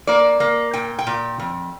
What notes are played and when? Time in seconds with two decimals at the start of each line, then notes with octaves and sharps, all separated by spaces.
0.07 A#3 D5
0.40 A#3
0.74 A#2 G5
0.99 G5
1.07 A#2
1.40 F2